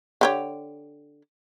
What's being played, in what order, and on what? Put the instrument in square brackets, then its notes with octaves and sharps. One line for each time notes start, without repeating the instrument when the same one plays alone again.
[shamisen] D3 G4 C#5